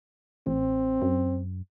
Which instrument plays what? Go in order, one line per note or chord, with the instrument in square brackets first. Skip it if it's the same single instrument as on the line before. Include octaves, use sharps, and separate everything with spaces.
[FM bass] A1 [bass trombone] C4
[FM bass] F#2